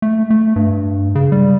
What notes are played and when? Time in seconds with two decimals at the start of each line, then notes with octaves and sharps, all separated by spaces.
0.02 A3
0.30 A3
0.56 G2
1.15 C#3
1.32 G3